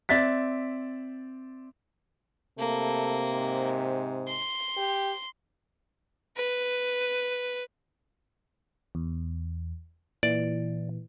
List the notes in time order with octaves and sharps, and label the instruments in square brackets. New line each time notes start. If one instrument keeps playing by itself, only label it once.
[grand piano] C4 D5 E5 A6 B6
[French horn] C3 [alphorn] A3 [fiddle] A#3
[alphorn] G#2
[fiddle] C6
[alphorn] G4
[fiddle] B4
[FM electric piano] E2
[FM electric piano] A#2 E3 [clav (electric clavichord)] D5